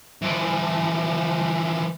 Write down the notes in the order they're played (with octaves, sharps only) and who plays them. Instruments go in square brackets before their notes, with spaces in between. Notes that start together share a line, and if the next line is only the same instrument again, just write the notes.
[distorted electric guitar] E3 F3